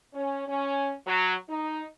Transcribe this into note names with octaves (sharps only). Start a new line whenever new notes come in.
C#4
C#4
F#3
D#4